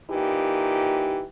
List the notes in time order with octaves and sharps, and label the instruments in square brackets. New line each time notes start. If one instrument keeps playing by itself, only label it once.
[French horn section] A#2 E3 D#4 G4